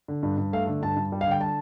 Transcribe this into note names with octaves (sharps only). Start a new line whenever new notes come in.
D3
G2
G2
A3 F5
D3
G2 A5
G2
G3
F5
D3 G5
A5